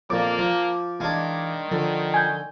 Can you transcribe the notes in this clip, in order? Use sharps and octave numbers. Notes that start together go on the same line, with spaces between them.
F2 A#2 A#3 D6
F3
D#3 E3 G#3 D4 F5 G#6
D3 F3
G#5 G6